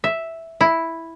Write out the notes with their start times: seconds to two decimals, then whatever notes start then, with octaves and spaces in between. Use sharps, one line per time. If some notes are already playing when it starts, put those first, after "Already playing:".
0.04 E5
0.61 E4